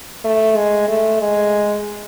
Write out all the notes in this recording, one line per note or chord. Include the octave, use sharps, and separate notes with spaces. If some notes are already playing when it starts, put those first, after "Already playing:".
A3
G#3
A3
G#3